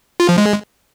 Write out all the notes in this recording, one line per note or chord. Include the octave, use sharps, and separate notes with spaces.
F4
F3
G#3